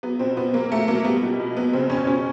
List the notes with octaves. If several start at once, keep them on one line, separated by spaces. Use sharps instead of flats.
F#3 B3
B2 C4
B2 B3
F#3 A#3
F#3 A3
F#3 A#3
G3 B3
B2
B2
F#3 B3
C#3 C4
F2 C#4
B2 C#4